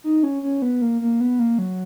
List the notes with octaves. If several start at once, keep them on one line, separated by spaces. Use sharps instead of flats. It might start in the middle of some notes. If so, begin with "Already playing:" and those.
D#4
C#4
C#4
B3
A#3
A#3
B3
A#3
F#3